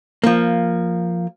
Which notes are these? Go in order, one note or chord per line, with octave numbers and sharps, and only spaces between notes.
F3 A#3